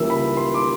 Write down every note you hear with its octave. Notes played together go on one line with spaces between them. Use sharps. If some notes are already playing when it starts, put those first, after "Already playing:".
Already playing: C#2 C#3 E3 G3 A#3 E6
B5
C6
D6